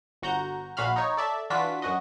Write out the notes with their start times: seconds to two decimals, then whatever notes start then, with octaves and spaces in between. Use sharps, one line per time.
0.22 G1 F#4 A#5 G6
0.77 A#1 A#2 F#4 F5 B5 F6
0.96 D#4 C#5
1.17 A4 D5 E5
1.50 E3 D4 F4 F#4 B6
1.82 F#2 F#4 D#5